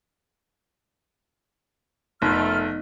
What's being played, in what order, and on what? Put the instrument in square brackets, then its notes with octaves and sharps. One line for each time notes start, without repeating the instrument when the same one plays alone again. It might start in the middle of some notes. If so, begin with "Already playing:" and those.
[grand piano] F1 [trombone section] D#3 A3 [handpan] B3 D#4 [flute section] F6